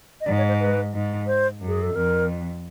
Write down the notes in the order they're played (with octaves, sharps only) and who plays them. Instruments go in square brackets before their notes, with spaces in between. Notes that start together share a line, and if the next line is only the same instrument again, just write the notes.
[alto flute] D#5
[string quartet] G#2 [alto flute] D5
[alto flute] C#5
C5
B4
[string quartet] G#2
[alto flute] C5
[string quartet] F#2
[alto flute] G#4
A4
[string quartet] F2 [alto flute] A#4